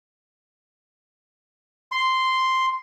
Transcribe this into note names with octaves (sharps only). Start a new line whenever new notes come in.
C6